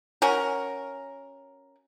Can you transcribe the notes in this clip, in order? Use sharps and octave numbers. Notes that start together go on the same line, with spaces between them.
C#4 F#4 A#4